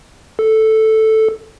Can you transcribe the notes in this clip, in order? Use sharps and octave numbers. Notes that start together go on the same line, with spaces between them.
A4